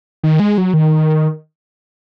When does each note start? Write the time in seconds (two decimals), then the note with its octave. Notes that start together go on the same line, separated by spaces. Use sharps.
0.23 D#3
0.40 G#3
0.58 F#3
0.74 D#3